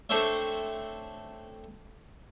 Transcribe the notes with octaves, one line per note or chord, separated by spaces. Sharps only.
A3 C4 D4 C5 C#5 E5